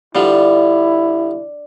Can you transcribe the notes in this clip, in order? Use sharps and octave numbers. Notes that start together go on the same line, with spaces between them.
D3 F3 G3 D4 E4